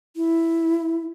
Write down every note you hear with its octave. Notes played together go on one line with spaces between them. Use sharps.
E4